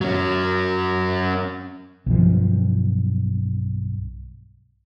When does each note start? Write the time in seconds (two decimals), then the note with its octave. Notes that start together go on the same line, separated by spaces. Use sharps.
0.01 F#3 C#4
2.06 B1 G2 F3